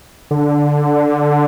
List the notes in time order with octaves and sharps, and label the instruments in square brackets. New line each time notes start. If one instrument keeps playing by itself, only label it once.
[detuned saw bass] D3